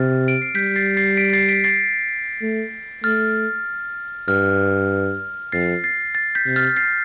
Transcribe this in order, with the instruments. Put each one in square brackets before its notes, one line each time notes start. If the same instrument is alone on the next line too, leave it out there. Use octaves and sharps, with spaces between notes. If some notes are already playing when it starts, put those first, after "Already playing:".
Already playing: [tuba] C3 [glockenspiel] F6 A6
[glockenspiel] D7
C7
[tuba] G3 [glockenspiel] G6 B6
[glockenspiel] A6 C7
A6 C7
B6 D7
A6 C7
B6 D7
A6 C7
[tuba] A3
[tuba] A3 [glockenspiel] F6 A6
[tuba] G2 [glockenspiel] F6
[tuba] F2 [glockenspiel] A6 C7
[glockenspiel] A6 C7
A6 C7
G6 B6
[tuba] C3
[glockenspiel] F6 A6
A6 C7